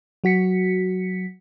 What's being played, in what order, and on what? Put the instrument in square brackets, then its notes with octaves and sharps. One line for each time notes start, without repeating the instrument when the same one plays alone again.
[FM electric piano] F#3 F#4 B6 C#7